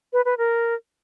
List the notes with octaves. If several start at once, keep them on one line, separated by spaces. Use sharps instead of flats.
B4
B4
A#4